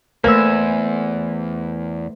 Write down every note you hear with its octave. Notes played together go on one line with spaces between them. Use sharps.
E2 A3 A#3 B4 C5 G#5 E6